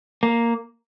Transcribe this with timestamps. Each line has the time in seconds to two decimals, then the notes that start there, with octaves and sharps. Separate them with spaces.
0.23 A#3